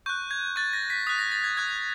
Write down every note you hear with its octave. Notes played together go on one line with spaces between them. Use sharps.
C#6 F#6 G6
G#6
C#6 F#6 A6
A#6
B6
D#6 F#6 B6
A#6
A6
G#6
D#6 F#6 G#6